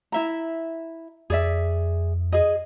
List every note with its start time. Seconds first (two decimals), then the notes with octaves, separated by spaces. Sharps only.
0.12 E4 E5 A#5
1.30 F2 G#4 D5 E5
2.32 G#4 D#5